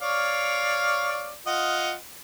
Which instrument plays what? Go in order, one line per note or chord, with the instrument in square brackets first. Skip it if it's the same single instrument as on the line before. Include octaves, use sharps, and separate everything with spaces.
[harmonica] C#5 D5 F5
F4 D#5 F#5